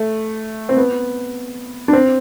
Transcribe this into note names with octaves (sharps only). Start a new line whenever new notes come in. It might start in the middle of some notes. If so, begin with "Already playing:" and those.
Already playing: A3
C4
B3
D4
C4